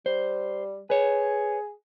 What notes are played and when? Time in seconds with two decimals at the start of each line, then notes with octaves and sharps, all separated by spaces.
0.06 G3 C5
0.90 G#4 B4 C#5